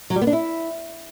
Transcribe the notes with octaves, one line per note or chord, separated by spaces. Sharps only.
F#3
G3
B3
D4
E4